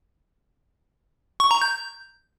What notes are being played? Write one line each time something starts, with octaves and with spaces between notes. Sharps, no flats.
C#6
A#5
G6